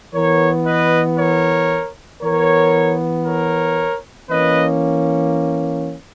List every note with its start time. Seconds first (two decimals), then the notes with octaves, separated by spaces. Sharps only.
0.15 E3 B3 A#4 C#5
0.66 B4 D#5
1.18 A#4 C#5
2.22 E3 B3 A#4 C#5
3.26 A#4 C#5
4.30 E3 A#3 C#4 B4 D#5